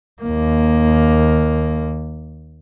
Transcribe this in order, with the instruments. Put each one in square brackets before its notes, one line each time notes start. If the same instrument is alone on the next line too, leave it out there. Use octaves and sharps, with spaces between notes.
[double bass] D#2 A#3